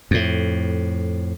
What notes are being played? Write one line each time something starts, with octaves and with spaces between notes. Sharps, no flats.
F2 A2